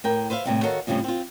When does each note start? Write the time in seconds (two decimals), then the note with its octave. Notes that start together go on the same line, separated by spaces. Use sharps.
0.04 A2 A#4 G5
0.30 B4 C5 E5 F5
0.45 A2 C3 G3
0.63 D#3 F#4 A4 C#5 F5
0.87 F2 A2 C#3 F3 G3
1.04 C4 F4